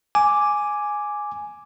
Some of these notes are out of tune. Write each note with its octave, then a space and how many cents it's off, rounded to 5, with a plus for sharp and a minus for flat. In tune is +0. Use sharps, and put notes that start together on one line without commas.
G#5 +0 D6 +0